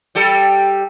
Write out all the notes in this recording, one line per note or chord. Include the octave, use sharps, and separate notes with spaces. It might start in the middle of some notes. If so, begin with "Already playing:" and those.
G3 G4 A4